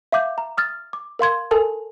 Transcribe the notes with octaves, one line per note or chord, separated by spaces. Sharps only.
E5 F5 D6 G6
A#5
D#6 F6 A6
D6
A#4 F5 C6 G#6
A4 A#4 G#5 A5